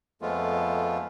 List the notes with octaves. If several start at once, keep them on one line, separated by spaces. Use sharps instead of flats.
F2 F3 G#3 A3 B3 F4